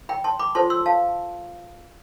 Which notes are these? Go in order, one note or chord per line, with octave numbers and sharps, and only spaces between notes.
G5 B5
A5 C6
B5 D6
F4 A4 C5 A5 C6
C6 E6
F5 A5